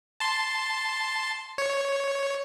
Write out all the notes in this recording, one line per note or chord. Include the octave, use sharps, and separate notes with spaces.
A5 C6
C#5